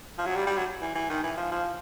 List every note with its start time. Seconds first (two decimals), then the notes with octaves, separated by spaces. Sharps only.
0.18 F3
0.26 F#3
0.36 G3
0.47 G3
0.57 F#3
0.81 E3
0.95 E3
1.09 D#3
1.24 E3
1.37 F3
1.51 F3